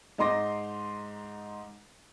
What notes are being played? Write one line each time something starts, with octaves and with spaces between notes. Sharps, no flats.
G#2 D#4 D#5 C6 D6 A#6